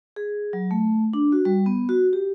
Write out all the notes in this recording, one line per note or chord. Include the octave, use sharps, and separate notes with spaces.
G#4
F#3
A3
D4
F#4
G3
B3
F#4
G4